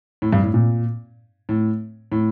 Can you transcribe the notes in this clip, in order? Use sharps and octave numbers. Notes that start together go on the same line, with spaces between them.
A2
G2
A2
A#2
A2
A2